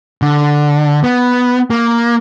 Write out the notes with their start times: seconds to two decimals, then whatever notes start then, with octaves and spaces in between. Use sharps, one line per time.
0.22 D3
1.04 B3
1.70 A#3